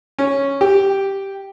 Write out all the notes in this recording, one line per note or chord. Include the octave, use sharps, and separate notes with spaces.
C#4
G4